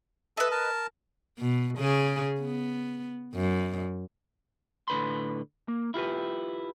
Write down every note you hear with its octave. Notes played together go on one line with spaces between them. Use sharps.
A4 B4 D#5 E5 A5
A#4 A5
B2
C#3 G#4
B3
F#2
A2 D3 B4 B5 C6
A#3
E4 F4 G4 B4